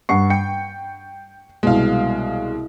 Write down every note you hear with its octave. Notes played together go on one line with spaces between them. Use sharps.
G2 F#5 C#6 C7
G5 C#7
C2 B2 G#3 F5